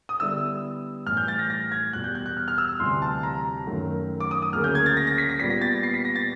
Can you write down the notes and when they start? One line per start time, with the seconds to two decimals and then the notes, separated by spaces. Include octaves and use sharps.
0.09 D#6
0.20 D3 G3 B3 E4 E6
1.06 A2 E3 G3 F6
1.17 G6
1.28 A6
1.39 A#6
1.50 A#6
1.72 G#6
1.93 E2 B2 G3 F#6
2.04 G6
2.15 F#6
2.26 F#6
2.37 F6
2.48 F6
2.58 E6
2.80 D2 C3 E3 G3 C6
3.02 A5
3.23 A#5
3.67 F#2 D#3 F#3 A3
4.20 D6
4.31 D#6
4.42 D#6
4.53 D2 C#3 F#3 A#3 C#4 F6
4.64 G6
4.75 G#6
4.86 A6
4.97 A#6
5.07 A#6
5.18 B6
5.29 A#6
5.40 A#2 G3 B3 B6
5.50 A#6
5.61 A6
5.73 A#6
5.83 C7
5.94 B6
6.05 A#6
6.16 A6